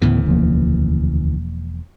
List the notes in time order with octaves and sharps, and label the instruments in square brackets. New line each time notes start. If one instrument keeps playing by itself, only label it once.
[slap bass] D2 C#3 E3 [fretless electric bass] A2 B3
[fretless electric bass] E1 F3 A#3